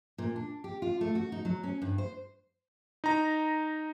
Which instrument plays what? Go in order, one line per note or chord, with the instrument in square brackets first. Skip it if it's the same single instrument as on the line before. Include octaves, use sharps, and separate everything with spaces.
[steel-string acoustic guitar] A#2
D4
G4
F4
A3
F#4
D#4
F#3
C#4
G2
C5
[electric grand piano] D#4 A#5